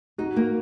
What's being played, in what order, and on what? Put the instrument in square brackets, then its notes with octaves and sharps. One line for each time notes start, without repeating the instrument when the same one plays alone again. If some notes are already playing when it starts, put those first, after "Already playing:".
[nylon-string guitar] D#4 [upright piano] F#4
[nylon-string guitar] A#3